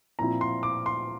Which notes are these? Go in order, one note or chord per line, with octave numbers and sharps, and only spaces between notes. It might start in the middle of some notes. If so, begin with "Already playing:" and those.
A#2 F3 C4 E4 A#5
C6
D6
C6